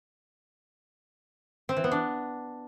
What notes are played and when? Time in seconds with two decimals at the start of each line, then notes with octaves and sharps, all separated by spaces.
1.69 C4
1.76 E3
1.84 B3
1.92 D4